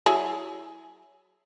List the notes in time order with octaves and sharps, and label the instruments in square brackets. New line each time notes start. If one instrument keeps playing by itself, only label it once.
[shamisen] F#3 E4 G#4